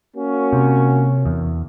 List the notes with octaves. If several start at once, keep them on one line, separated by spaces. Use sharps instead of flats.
A#3 C#4 F#4
C3
E2